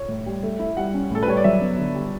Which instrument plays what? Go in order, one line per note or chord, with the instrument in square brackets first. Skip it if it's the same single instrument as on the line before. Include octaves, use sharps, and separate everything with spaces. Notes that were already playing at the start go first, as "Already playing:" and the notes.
Already playing: [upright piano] C#5
[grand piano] A2
G3
A3
E4
[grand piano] G3 [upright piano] F#5
[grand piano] C#4
[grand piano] A2 [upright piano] A4
[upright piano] B4
[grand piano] G3 [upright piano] C#5
[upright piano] D5
[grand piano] F#3 [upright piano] E5
[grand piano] B3
D3
G3